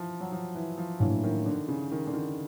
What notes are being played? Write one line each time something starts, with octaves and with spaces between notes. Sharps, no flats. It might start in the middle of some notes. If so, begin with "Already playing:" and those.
Already playing: E3 F3
F#3
F3
E3
F3
A2 E3 F#3 A#3 D4
D#3
D3
C#3
D#3
D3
D#3